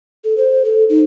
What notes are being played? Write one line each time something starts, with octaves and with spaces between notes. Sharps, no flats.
A4
C5
A4
D#4